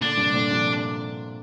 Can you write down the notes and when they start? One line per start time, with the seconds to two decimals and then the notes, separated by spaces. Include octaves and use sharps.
0.01 A#2 D3 D4
0.17 G2 C3
0.34 A#2 D3
0.51 C3 F3